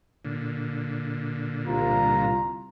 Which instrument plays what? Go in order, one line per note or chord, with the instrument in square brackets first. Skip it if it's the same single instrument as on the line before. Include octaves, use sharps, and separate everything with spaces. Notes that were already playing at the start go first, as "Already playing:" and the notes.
[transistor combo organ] A#2 D3
[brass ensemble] C2 F4 A#5